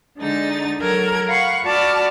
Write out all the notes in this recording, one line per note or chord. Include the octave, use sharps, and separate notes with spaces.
D3 G#3 D#4 A6
F#3 A4 A#4 G#6
F5 F#5 B5 C#6
F#4 D5 A5 B5 F6